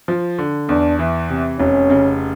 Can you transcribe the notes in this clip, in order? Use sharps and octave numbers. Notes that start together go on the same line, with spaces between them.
F3
D3
E2 D4
E3
C3
F1 C#4
C#3